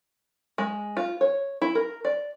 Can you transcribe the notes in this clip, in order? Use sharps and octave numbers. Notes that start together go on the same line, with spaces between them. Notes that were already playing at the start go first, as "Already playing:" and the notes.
G#3
F4
C#5
E4
A#4
D5